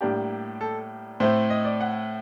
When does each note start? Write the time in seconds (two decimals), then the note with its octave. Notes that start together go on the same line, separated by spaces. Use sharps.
0.01 A2 G3 A#3 D4 G4
0.61 A4
1.20 A2 A3 C4 C5
1.50 D#5
1.65 D5
1.81 F#5